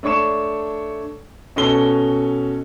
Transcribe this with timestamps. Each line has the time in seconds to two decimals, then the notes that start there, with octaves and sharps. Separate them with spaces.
0.03 A3 D4 C#5 C#6 E7
1.56 B2 C#4 A4 G7